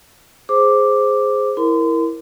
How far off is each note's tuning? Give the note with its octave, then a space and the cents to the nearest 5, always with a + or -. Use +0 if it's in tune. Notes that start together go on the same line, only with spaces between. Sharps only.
G#4 +0 C5 +0 D6 +0
E4 +0 A#4 +0 C6 -40